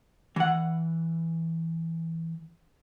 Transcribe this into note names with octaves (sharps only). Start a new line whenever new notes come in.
E3 F#5